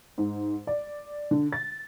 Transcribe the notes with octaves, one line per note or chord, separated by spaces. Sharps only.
G#2
D5
D3
A6